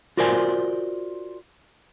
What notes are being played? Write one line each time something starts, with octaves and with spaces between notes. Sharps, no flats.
F4 F#4 A#4 C5 D5 G#5